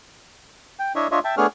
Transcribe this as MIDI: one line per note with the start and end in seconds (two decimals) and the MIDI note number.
0.79 0.93 79
0.96 1.08 62
0.96 1.08 64
0.96 1.08 73
0.96 1.08 75
0.96 1.08 76
1.11 1.19 62
1.11 1.19 65
1.11 1.19 73
1.11 1.19 75
1.11 1.19 76
1.24 1.35 76
1.24 1.35 79
1.24 1.35 81
1.37 1.47 57
1.37 1.47 59
1.37 1.47 62
1.37 1.47 68
1.37 1.47 73
1.37 1.47 89